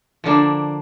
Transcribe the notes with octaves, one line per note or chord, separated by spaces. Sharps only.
D3 F3 A#3 D4